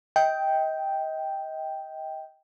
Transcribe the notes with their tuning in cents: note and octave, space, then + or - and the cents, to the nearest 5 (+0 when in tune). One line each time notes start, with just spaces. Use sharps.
D#5 +30 G5 +0